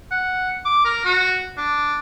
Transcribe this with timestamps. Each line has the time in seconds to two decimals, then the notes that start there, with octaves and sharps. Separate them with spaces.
0.11 F#5
0.65 D6
0.85 A#4
1.05 F#4
1.57 D4